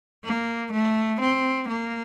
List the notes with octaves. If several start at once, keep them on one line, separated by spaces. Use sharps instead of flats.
A#3
A3
C4
A#3